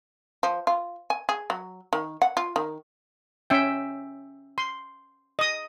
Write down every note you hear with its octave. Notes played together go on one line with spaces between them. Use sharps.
F3
F4
G#5
G#4
F#3
D#3
F#5
F4
D#3
C#4 E5 G5
C6
D#5 D#6